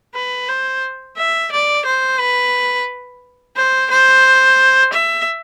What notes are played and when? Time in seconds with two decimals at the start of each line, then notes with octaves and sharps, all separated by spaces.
0.15 B4
0.49 C5
1.17 E5
1.52 D5
1.85 C5
2.19 B4
3.56 C5
3.91 C5
4.93 E5